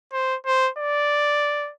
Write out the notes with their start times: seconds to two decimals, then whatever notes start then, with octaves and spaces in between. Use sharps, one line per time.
0.13 C5
0.46 C5
0.79 D5